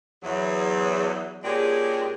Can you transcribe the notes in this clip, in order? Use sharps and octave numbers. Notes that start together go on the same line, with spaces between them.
E2 F#3
A#2 G#3 C#4 D4 G4 G#4